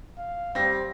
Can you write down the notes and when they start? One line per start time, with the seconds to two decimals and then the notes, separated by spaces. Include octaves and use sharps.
0.18 F5
0.55 G3 C4 A#6